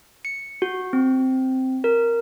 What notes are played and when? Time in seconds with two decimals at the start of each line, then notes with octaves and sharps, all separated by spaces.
0.25 C#7
0.62 F#4
0.93 C4
1.84 A#4